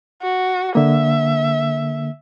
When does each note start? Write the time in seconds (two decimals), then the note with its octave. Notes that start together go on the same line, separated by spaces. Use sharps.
0.22 F#4
0.75 D3 A#3 E5